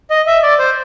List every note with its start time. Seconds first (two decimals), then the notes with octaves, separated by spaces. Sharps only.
0.10 D#5
0.27 E5
0.43 D5
0.59 C5